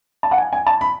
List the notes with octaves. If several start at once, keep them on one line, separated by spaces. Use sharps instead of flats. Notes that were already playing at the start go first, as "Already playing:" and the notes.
A5
F#5
G#5
G#5
A5
B5